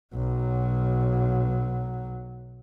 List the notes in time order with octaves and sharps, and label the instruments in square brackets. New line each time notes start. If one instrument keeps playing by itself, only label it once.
[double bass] B1 F#3